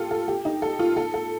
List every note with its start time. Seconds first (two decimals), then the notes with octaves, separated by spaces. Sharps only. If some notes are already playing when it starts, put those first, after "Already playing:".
Already playing: F4 G4 A4
0.11 A4
0.28 G4
0.45 D#4
0.62 A4
0.79 F4
0.97 A4
1.14 A4